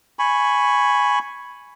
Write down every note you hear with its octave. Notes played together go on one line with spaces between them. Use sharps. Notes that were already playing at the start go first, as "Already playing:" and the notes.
G#5 B5 C#6